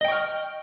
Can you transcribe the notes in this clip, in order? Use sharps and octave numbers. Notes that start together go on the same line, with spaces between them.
D#5 G5 C#6 F6